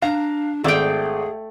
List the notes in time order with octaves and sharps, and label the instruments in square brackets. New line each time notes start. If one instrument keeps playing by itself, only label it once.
[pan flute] D4 [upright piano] F5 [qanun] A#5
[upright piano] G#1 D5 [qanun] A3 G5 [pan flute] G#4